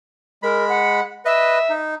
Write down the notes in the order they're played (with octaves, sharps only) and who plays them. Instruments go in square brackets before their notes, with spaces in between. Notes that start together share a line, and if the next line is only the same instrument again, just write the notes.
[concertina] G#3 B5 [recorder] A#4
[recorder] F#5
[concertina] B4 D#5 [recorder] E5
[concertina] D#4